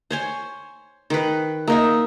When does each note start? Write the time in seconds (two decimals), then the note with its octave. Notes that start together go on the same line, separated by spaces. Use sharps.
0.11 C5 C#5 G#5
1.10 D#3 B4
1.68 A#3 D#4 E5